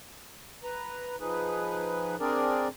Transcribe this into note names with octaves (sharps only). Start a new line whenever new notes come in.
B4 A#5
F3 D#4 G#4 B4
C4 D4 G#4 A#4 D5